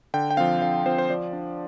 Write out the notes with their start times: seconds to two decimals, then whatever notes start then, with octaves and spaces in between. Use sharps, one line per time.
0.14 D3 G5
0.31 G5
0.37 F3 C4 F5
0.62 D3 F5
0.86 F3 C4 C5
0.98 C5
1.10 F3 D5
1.33 D4